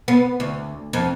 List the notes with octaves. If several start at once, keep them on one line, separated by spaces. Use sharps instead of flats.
B3
D2
F2